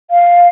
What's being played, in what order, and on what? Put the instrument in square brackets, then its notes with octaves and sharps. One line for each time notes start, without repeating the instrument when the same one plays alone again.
[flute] F5